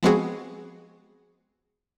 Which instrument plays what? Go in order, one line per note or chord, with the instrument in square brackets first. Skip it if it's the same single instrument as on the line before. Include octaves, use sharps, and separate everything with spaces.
[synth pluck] F3 G#3 B3 C4 F#4 G#4